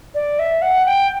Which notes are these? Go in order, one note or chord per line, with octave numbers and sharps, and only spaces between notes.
D5
E5
F#5
G5